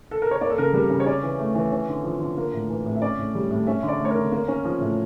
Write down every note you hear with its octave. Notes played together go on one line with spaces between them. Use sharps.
A4
A#4
C#5
A#3 D5
A4
C#3 A#4
G3 A#4
C#3
C#5
C#4 D5
E3
A3
E3
C#4
D3
F3
D3
A#3
A2
E3
A2
E5
C#4 D5
A2
G3
A2
C#4 E5
D3 E5
D5
A3
C#5
A#4
D3
A#3
C#4
F3
A2